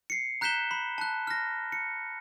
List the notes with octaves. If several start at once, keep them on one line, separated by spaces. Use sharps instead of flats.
C7 C#7
A#5 F#6 G6 B6 E7 G7
B5
A5 F#6
F6 A#6
C#7